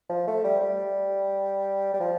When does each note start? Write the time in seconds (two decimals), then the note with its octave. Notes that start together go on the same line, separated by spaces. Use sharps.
0.09 F3
0.27 A3
0.44 G3
0.61 G3
1.93 G3
2.00 F3